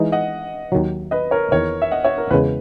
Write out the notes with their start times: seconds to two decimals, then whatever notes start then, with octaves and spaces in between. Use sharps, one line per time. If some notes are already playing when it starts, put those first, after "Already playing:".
Already playing: E3 G#3 D#4
0.12 D#5 F#5
0.72 D#2 D#3 F#3
1.11 B4 D#5
1.31 A#4 C#5
1.51 E2 D#3 A#3 A#4 C#5
1.82 E5
1.91 D#5 F#5
2.04 C#5 E5
2.18 A#4
2.31 E2 C#3 G#3 B4